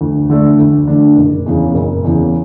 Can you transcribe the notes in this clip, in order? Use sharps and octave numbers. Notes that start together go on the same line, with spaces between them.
D2
D3 A3 D4
D2
D3 A3 D4
F#1
E2 C#3
F#1
E2 C#3